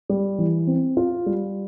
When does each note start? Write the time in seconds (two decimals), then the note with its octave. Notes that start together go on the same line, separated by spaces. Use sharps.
0.10 G3
0.39 E3
0.67 C4
0.97 F4
1.26 G3